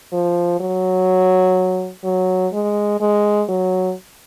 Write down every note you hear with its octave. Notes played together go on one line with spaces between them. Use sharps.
F3
F#3
F#3
G#3
G#3
F#3